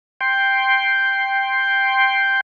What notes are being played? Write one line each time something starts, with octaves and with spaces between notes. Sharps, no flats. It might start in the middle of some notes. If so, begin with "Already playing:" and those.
G5 C6